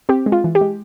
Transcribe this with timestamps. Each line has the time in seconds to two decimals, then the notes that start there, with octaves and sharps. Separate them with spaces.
0.09 C4 G4
0.26 G#3
0.32 F4
0.44 E3
0.55 G4
0.61 G#3